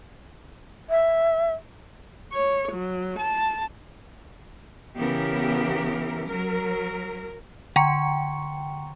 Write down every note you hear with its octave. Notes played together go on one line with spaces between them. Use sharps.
E5
C#5
F#3
A5
C#3 E3 B3 G4 A#4
F#3 A#4
D3 G5 A#5 C#6 C#7